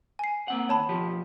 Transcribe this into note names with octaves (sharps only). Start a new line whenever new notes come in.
G#5 C7
A#3 C4 F#5
D#2 B3 C#5 A5 B5
B2 F3 G4